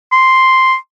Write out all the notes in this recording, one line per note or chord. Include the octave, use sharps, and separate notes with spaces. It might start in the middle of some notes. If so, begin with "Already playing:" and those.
C6